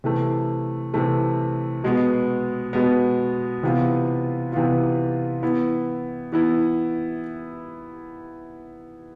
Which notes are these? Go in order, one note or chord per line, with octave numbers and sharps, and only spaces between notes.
C3 E3 A3
C3 E3 A3
B2 G#3 B3
B2 G#3 B3
C3 E3 B3 F4
C3 E3 B3 F4
E3 B3 E4
E3 B3 E4